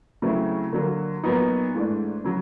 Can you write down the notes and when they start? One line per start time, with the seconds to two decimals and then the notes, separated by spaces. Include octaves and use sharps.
0.22 C#3 F#3 A3 C4 E4
0.73 D3 F#3 A#3
1.23 A#2 F#3 B3 D#4
1.74 G#2 E3 A3 D4
2.24 C#3 F#3